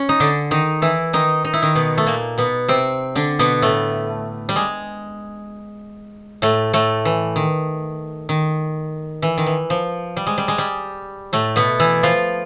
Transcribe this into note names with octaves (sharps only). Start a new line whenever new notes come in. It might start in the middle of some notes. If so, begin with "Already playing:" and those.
Already playing: C#4
D#4
D3 D4
D#3 D#4
E3 E4
D#3 D#4
D#4
E4
D#3 D#4
B2 B3
A3
A#2 A#3
B2 B3
C3 C4
D3 D4
B2 B3
A2 A3
G3
G#3
A2 A3
A2 A3
E3
D#3
D#3
E3
D#3
E3
F3
G3
G#3
G3
G#3
G3
A2 A3
B2 B3
E3 E4
F3 F4